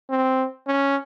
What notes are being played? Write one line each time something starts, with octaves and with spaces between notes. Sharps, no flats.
C4
C#4